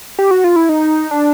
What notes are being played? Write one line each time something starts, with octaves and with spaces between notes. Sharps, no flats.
G4
F#4
F4
E4
D#4
D4